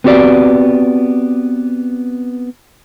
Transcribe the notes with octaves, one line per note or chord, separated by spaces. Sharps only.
B3 C4 F#4 G4 D5